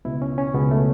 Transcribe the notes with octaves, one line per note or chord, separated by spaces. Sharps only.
C#2 B2 E4
C#4
C#4
C#2 B2 B3
A3